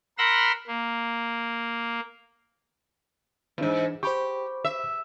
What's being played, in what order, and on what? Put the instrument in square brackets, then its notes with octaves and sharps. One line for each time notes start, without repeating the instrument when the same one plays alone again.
[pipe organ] A#4 F#5 B5 C6 E6 A#6
A#3
[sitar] E2 G#2 [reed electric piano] E3 D4
[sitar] G4 [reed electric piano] C5 B5 C#6
[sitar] E5